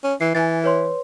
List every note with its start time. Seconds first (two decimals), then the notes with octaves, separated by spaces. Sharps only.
0.04 C#4
0.21 E3 C7
0.35 E3 G#5 A6
0.64 B4 C#5 C6